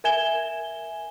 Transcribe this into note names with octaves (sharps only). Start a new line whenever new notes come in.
A#4 E5 G#5 G#6 E7 G7